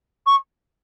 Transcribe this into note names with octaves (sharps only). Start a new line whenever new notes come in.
C#6